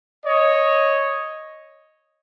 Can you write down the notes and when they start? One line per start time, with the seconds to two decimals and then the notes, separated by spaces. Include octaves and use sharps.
0.25 C#5 D#5